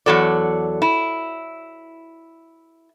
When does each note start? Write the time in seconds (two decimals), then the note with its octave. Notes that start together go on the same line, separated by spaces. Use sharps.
0.06 E2 G2 F#3 A4 D5
0.82 E4